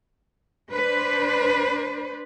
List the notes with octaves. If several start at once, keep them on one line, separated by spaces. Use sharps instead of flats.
D4 B4 C5